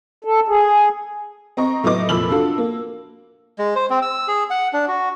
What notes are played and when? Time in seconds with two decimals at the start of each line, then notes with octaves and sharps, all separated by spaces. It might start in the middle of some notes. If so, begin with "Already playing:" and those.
0.24 A4
0.48 G#4
1.57 C4 D#5 A#5 C#6
1.83 A2 F#3 B3 D#5 D6
2.09 F1 A#2 F3 B5 E6 F#7
2.30 D4 F4 F#4 A4
2.58 A#3
3.59 G#3
3.75 C5
3.90 C4
4.02 E6
4.28 G#4
4.50 F#5
4.73 D4
4.88 F#4